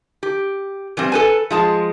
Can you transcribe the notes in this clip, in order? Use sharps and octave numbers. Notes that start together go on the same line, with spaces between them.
G4
E3 G3 C4
A4 B4 G#5
F3 G#3 A5